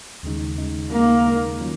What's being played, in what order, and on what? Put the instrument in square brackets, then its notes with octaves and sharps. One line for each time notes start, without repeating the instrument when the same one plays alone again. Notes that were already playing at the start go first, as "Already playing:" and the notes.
[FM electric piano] D#2 C#3 G#3 D#4
D#2 C#3 G#3 D#4
[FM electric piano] D#2 C#3 G#3 D#4 [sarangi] A#3
[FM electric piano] D#2 C#3 G#3 D#4
D#3 F#3 C#4 F4